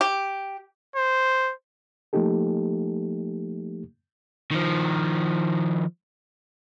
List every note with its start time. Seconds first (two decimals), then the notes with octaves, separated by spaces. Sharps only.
0.01 G4
0.96 C5
2.13 F3 A3 A#3 D#4 G4 A4
4.51 D#3 F3